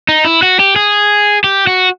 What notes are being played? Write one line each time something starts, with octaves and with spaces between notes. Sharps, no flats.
D#4
E4
F#4
G4
G#4
G4
F#4